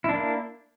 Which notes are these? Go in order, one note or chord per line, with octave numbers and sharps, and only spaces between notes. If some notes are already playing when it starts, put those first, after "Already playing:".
A#3 D4 E4